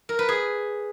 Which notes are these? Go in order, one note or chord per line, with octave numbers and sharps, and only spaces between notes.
A#4
B4
G#4